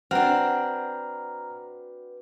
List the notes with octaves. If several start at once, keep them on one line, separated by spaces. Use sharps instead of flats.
C4 D4 F#4 B4 F#5 A#5 F6